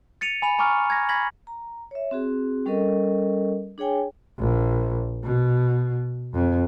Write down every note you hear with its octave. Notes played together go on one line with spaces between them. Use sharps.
A6 C#7 D#7 F7
G#5 B5 F7
G#5 A#5 C#6 D6 F6
G#6 A#6
B5 G#6 A#6 B6 F#7
A#5
C#5 E5
C4 F#4 G#4
G3 C#4 A4 A#4 D#5
D4 G#4 C#5 G5 G#5
A#1
B2
F2